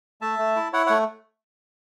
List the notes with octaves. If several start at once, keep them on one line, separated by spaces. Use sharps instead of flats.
A3 E5 A5
A3
E4
E4 C#5 F#5
A3 C#5 F#5